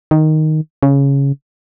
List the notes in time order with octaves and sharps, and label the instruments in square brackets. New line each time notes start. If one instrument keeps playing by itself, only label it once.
[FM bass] D#3
C#3